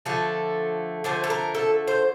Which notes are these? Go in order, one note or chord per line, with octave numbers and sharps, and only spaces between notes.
D3 F3 A3 A4
D3 F3 A3 C5
A4
A#4
A4
C5